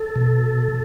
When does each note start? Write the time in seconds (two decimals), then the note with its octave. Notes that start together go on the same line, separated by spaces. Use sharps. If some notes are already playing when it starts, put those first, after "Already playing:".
Already playing: A4
0.16 B2